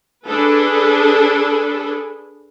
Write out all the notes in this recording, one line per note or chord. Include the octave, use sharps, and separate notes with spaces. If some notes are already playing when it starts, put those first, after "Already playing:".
D4 G#4 A4 B4